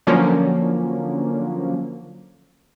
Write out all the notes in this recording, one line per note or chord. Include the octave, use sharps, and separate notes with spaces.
D3 F3 F#3 A#3 C#4